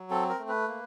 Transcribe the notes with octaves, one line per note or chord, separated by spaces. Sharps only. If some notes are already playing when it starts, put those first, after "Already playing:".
Already playing: F#3
C4 A4
A#4
A3
B4
A#3